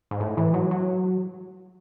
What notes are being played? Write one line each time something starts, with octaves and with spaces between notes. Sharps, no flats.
G#2
A2
E3
F#3
F#3